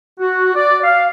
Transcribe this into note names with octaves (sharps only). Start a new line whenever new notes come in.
F#4
D5
F5